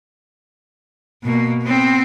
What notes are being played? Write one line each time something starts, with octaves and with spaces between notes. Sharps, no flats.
B2 A#3
B3 C4